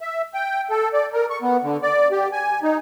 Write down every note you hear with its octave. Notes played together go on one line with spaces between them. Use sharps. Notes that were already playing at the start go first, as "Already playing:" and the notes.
E5
G5
A4
D5
A#4
C#6
B3
D3
D5
G4
G#5
D#4